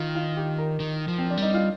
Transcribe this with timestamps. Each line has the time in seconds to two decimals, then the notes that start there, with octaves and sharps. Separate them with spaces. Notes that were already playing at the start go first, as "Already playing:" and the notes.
Already playing: D#3 F4
0.15 F4
0.37 G4
0.58 A#4
0.80 D#3
1.08 F3
1.18 C4
1.30 D4
1.37 G3 D#4
1.54 F4